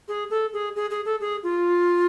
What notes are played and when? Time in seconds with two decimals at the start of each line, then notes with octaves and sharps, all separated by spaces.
0.08 G#4
0.31 A4
0.53 G#4
0.76 G#4
0.91 G#4
1.05 A4
1.21 G#4
1.43 F4